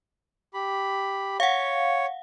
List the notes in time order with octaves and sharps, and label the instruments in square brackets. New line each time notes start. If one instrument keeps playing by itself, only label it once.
[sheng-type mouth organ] G4 B5
[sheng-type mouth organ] C#5 [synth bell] F5 F#5